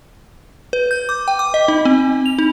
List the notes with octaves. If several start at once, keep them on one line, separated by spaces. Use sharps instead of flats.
B4
G6
D6
G5
D6
D#5
D#4
C4
F7
D#4